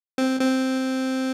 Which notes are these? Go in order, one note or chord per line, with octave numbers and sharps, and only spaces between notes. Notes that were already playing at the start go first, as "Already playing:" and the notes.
C4
C4